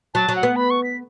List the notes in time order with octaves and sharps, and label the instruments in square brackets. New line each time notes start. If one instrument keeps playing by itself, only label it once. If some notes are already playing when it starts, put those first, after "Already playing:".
[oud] F#3 [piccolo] A5
[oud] F#3
[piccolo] F#5
[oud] B3
[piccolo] B5
C#6
B6